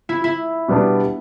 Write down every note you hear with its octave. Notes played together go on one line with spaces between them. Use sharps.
E4
E4
B2 G3 B3 D4